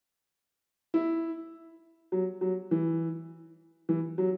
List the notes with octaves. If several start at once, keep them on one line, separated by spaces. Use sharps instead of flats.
E4
F#3
F#3
E3
E3
F#3